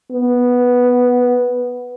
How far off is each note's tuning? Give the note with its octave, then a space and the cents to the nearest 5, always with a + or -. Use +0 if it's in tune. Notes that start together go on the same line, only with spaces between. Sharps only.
B3 -5